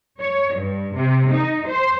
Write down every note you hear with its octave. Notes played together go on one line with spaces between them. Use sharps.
C#5
G2
C3
D#4
C5